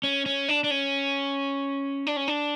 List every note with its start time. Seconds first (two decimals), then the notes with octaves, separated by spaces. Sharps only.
0.04 C#4
0.26 C#4
0.49 D4
0.64 D4
0.71 C#4
2.07 D4
2.16 C#4
2.28 D4